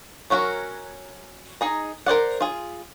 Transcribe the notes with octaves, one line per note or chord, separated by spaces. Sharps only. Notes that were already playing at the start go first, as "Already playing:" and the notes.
F#3 C#4 F#4 A#4
D#4 G#4 A#5
A#4 C5 D5 F#5
F4 G#4